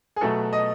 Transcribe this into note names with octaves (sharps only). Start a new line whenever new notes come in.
G#4
B2 F#3 A3 A4
D#5